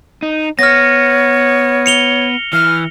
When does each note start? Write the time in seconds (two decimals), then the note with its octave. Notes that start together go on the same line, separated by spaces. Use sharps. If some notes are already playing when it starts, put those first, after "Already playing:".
0.22 D#4
0.59 B3 C#5 F6 A#6
1.86 C#7 F7 G7
2.53 E3 F6